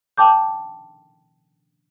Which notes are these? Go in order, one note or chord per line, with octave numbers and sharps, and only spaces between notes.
G5 A5 D6 G6